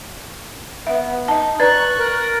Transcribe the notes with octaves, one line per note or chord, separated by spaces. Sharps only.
B3 E5
D#4 D#5 A5
B4 D5 A#5 C#6 F#6 A6
A#4